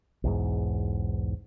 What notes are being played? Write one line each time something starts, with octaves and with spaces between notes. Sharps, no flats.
B1 E2 G#2